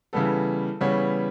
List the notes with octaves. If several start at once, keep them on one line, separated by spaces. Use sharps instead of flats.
C#3 E3 G3 B3 A4
C#3 E3 G3 B3 C#5